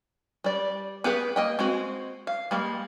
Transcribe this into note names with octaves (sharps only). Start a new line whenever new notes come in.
G3 D5
B3 G4 G#4 B4
A#3 D#5 G5
G#3 C4 F#4
F5
G3 G#3 A#3